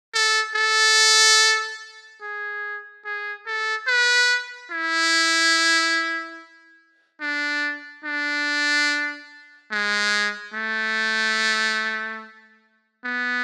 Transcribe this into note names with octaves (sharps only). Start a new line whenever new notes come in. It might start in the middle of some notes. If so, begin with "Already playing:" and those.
A4
A4
G#4
G#4
A4
B4
E4
D4
D4
G#3
A3
B3